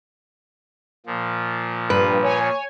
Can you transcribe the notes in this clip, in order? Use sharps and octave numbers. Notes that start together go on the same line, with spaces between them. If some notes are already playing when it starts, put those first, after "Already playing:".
A#2 F3
G2 B4
C#5 G#5